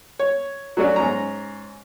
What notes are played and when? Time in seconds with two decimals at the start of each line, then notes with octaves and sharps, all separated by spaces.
0.19 C#5
0.77 F#3 A3 C#4 D4 F#4
0.96 G#2 C#4 A#5